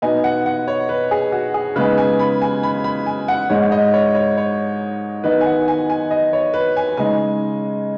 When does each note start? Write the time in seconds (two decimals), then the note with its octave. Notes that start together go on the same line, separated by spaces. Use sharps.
0.02 B2 B3 D#4 G#5
0.24 F#5
0.46 F#5
0.68 C#5
0.89 B4
1.11 G#4
1.32 F#4
1.54 G#4
1.76 C#3 G#3 B3 D#4 B4
1.98 G#5
2.19 B5
2.42 G#5
2.63 B5
2.84 B5
3.06 G#5
3.28 F#5
3.50 G#2 G#3 D#4 C#5
3.72 D#5
3.94 C#5
4.15 C#5
4.38 C#5
5.24 D#3 B3 D#4 B4
5.41 G#5
5.46 F#5
5.68 G#5
5.90 G#5
6.11 D#5
6.33 C#5
6.54 B4
6.77 G#5
6.97 C#3 G#3 D#4 G#5